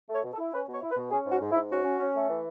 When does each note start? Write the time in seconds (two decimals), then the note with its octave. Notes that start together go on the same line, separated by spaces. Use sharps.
0.09 A3 C#5
0.23 B2
0.33 A4
0.38 E4
0.53 C#4 B4
0.68 B2 C#5
0.82 E4
0.91 B4
0.97 B2
1.11 C#4 G#4
1.26 G#2 F#4
1.41 G#2
1.51 E4
1.55 G#2
1.70 C#4 F#4
1.85 C#4
1.99 C#4
2.15 A3
2.29 E3